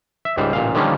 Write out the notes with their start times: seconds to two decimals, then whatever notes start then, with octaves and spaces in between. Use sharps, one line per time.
0.25 E5
0.37 C#2 G#2 G3 C5
0.53 A1 A#2 F5
0.75 D3 D#3 F3 G3 A#3 C#4